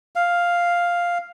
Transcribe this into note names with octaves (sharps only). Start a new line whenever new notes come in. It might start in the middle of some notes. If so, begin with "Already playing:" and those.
F5